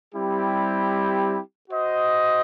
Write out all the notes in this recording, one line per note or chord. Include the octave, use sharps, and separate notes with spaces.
G3 C4 E4 G4
F#4 C5 D#5